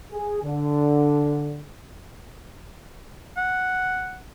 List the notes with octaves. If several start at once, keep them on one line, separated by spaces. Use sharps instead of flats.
G#4
D3
F#5